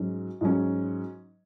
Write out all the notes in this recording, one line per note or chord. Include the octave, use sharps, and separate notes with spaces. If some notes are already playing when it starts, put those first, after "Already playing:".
Already playing: G#2 F#3 C#4
G#2 F#3 C#4